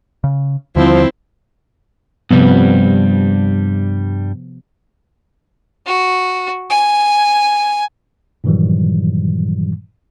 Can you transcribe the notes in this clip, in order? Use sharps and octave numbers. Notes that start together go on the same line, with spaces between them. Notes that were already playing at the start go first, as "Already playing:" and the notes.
C#3
D#2 D3 F3 G3 C4 E4
G2 C3 F3 G3 B3
F#4
G#5
G2 A#2 D#3 E3 F#3 G3